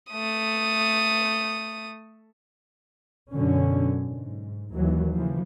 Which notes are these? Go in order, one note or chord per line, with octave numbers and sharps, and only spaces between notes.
A3 D#6
F#2 B2 D3 C#4
G#2
D#2 E3 F#3
C#3 E3 F3